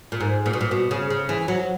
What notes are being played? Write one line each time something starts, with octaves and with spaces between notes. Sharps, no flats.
A#2
G#2
A#2
B2
A#2
B2
C#3
C#3
E3
F#3